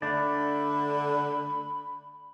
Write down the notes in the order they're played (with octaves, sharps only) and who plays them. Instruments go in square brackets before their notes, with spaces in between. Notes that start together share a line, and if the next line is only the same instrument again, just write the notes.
[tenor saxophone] D3 [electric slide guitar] A3 D4 D5 [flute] B5